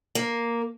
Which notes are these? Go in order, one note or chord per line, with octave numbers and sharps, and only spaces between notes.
A#3